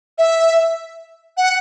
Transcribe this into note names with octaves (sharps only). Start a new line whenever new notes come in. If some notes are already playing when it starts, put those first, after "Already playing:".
E5
F#5